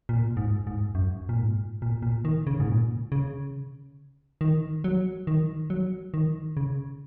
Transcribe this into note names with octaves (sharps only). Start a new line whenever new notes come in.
A#2
G#2
G#2
F#2
A#2
G#2
A#2
A#2
D#3
C#3
G#2
A#2
C#3
D#3
F#3
D#3
F#3
D#3
C#3